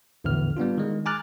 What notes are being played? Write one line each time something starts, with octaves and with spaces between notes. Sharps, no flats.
A#1 E2 A2 D3 E3 F6
G3 B3 D4 F4
D#3 G#3
G#5 A#5 D6 F6 F#6 A6